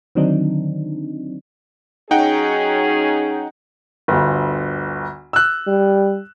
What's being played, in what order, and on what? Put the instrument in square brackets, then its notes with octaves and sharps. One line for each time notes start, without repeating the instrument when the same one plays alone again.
[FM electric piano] D3 D#3 F#3 C4 D4 D#4
[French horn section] F#3 C#4 G#4 [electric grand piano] D#4 F#5 G5
[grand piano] G1 D2
E6 F#6
[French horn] G3